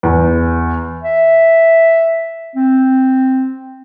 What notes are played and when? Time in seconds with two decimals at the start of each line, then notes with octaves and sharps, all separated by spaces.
0.03 E2
1.04 E5
2.56 C4